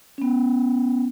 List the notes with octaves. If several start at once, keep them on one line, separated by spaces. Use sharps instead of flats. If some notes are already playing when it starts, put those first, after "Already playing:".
B3 C#4